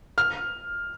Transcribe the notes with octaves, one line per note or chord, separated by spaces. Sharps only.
F6